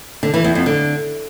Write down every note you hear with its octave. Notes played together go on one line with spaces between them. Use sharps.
D3
E3
E2
F2
D3